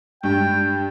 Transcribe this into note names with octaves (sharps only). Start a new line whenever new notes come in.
G2 G5